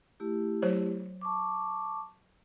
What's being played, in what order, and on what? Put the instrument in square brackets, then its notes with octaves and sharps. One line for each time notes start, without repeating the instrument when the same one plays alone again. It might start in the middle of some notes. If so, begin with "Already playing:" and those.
[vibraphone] A3 E4 G4
[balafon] F#3 C5 C#5
[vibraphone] A5 C#6 D6